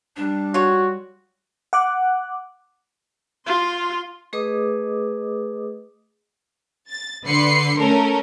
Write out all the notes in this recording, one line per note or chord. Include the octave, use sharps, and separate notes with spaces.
G3 D4
F4 F#4 C#5
F#5 D6 F#6
F4 C6
A3 G#4 B4 D#5 D6 D#6
A6
D3 B4 C6 C7 C#7
A3 C#4 A4 A#4